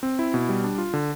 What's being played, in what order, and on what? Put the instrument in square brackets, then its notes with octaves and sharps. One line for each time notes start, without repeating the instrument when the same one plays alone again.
[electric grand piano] C4
E4
B2
G3
D4
F4
D3